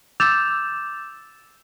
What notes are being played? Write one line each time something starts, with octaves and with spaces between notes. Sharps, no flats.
D6 E6 G6 A6 E7 F7